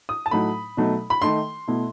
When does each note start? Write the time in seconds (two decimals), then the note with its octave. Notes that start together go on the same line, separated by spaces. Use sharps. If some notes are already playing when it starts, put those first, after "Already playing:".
0.09 D#6
0.26 A5
0.31 A2 F#3 A3 D#4 B5
0.77 B2 F#3 A3 D#4
1.10 B5
1.22 D#3 A3 D#4 C6
1.68 B2 A3 E4